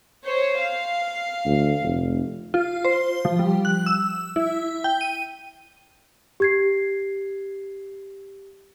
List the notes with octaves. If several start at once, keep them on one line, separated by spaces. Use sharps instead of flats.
C5 C#5
F5
D2
F1
F4
C5
F3
G3
F#6
E6
E4
G5
D#7
G4 G#6 C7